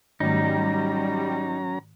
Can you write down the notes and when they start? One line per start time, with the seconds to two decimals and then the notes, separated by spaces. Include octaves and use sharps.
0.20 G#2 D#3 F#3 G3 A3 C#4 D#4 A#5